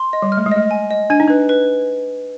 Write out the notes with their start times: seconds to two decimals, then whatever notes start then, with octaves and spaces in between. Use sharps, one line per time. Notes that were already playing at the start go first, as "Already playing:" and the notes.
Already playing: C6
0.13 D#5
0.22 G3
0.32 F6
0.37 A3
0.46 G#3
0.51 A3 D#5
0.71 G#5
0.91 D#5
1.10 D4 G#5
1.20 D#4
1.28 D4 B4
1.49 B4